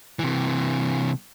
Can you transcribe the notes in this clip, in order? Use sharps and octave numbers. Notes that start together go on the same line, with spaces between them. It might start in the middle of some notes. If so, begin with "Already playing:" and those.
C3 E3